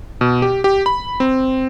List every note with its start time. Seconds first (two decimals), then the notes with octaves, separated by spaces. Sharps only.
0.21 B2
0.42 G4
0.64 G4
0.86 B5
1.20 C4